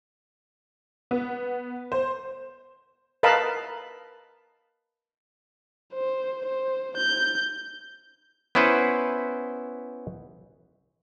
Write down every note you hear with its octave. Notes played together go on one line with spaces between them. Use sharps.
B3
C5
A#4 B4 D#5 F5 A5 B5
C5
C5
G6
B3 C#4 E4 B4 C5